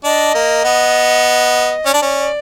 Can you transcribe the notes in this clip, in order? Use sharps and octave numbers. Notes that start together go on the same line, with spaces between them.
D4 D#5
A#3
B3
C#4 D5
D4
C#4